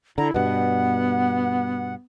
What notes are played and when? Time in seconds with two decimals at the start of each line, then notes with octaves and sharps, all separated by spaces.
0.18 D3 E4 A#5
0.34 G2 B2 B3 F#5